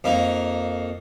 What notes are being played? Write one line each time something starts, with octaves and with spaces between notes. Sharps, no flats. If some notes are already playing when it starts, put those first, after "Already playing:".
F2 A#3 D#4